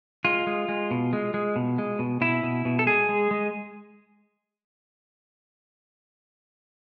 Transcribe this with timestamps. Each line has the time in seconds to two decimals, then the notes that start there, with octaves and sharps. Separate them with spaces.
0.25 G#3 F4
0.47 G#3
0.69 G#3
0.91 B2
1.13 G#3
1.34 G#3
1.56 B2
1.78 G#3
1.99 B2
2.21 B2 E4
2.43 B2
2.65 B2
2.79 A4
2.86 G#3 G#4
3.09 G#3
3.31 G#3